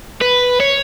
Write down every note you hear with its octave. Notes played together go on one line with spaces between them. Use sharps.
B4
C#5